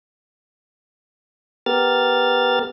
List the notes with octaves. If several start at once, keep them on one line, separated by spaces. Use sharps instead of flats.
B3 G4 A#4 F6 A6